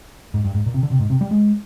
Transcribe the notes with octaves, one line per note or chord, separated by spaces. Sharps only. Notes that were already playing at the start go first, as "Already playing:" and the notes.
G#2
G2
G#2
A#2
C3
D3
C3
G#2
C3
G3
G#3